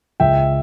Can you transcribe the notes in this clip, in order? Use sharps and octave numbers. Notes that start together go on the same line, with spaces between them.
C#2 E5 G5